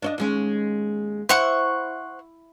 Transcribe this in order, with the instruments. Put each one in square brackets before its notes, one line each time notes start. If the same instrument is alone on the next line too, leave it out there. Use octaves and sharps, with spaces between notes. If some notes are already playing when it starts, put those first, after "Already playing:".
[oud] D4 C#5 D#5
D#2 G#3 C#4
[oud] E4 [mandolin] C5 F#5 C#6